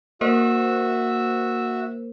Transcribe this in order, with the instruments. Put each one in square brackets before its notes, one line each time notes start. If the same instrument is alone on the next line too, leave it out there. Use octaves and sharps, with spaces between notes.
[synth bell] A#3 A#4 C5 [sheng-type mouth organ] F#4 E5